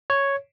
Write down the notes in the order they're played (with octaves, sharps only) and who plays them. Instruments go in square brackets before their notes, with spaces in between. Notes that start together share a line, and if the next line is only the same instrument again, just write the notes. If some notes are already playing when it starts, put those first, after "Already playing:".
[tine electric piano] C#5